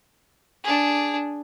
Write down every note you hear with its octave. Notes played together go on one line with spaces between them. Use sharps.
D4 G#4